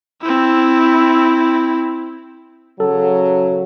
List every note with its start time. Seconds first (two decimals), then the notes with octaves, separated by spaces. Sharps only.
0.22 C4 E4
2.80 C#3 F#3 A4